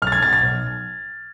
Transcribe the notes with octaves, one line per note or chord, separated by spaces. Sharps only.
B1 F6
A6
G#6
B2 A6
A6
B1